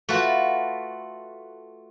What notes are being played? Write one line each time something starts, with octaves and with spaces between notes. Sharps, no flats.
A3 F4 F#4 B4